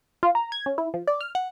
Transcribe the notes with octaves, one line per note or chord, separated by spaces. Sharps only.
F4
A#5
G#6
C#4
E4
F3
D5
F6
F#5